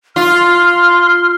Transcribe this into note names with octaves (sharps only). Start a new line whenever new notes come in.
F4 C6 F6